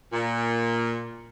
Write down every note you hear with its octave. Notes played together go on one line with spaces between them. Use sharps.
A#2